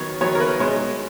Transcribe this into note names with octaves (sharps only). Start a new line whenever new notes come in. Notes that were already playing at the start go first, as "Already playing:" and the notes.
Already playing: D#3 F#3 B3 C#5
D#3 F#3 B3 C#5
A#4
B4
B2 G#3 C#5